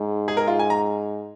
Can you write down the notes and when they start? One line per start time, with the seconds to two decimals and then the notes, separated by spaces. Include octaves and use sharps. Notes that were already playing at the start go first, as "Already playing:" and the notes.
Already playing: G#2
0.28 G#4
0.37 A#4
0.47 F4
0.59 G#5
0.70 A#5